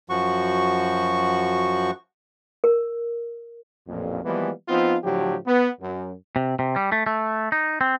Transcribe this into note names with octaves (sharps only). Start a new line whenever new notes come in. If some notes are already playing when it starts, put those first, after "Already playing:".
F#2 F3 F#4 C#6
A#4
A1 F2 A#2
E3 F3 G3 G#3 A#3 B3
F3 B3 C4 D#4 F4
A2 D3 F3 F#3 G4
B3
F#2
C3
C3
G3
A3
A3
D#4
C4